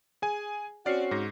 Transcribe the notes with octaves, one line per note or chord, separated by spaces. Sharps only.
G#4 G#5
C4 C#4 F#4 D5 F6 C7
G#2 A#6